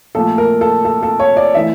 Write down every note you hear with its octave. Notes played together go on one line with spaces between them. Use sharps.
A#2 F3 A3 A4
A#4
A4
A4
A4
C#5
D5
E3 A3 E5